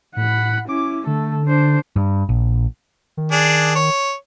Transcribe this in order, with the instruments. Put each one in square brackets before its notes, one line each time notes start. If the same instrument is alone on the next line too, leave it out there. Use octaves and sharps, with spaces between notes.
[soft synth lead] A2 [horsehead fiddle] F#5 B5
[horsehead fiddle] C#4 E4 [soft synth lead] D6
[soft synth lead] D3 [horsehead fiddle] A3 A4
[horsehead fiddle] D4 C5
[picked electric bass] G2
A#1
[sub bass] D#3
[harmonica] D4 G#4
C#5